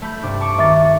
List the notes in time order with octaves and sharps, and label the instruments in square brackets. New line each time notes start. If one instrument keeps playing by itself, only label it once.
[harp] A3 B5 G6
G2 C3 D4
A5 C#6 D6
[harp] D#3 [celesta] E5 D6 A6